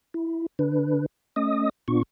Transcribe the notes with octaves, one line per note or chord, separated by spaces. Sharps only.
E4
D3 D4 B4
A3 C#4 D#5 D#6
A#2 B3 D4 F4 C#6